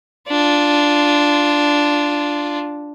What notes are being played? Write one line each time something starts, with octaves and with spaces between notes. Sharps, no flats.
D4 F4